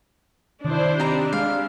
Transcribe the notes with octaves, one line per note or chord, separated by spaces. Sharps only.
C3 D#3 D4 E4 C5
C4 D4 D#4 G4 A#5 B5 E6
G#3 F5